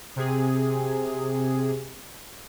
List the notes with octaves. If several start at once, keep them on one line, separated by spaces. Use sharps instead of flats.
C3 G#4